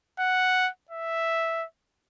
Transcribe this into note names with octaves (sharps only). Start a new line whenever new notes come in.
F#5
E5